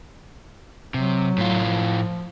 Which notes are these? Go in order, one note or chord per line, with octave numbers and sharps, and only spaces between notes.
C3 F#3
A2 F4
F3